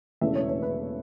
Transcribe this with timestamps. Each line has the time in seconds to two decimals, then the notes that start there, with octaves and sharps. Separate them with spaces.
0.21 E1 E2 C#3 E3 A3 E5
0.35 C#5
0.48 C#5
0.62 B4